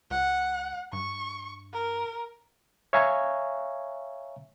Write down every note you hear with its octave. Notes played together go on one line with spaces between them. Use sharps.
C#2 F#5
G2 C#6
A#4
C#5 E5 F5 G#5 A#5 C#6